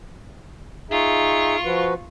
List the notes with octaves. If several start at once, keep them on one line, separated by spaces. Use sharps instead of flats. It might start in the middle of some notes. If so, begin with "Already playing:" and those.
D#4 F4 G#4 E5 C#6
F3 F#4 B4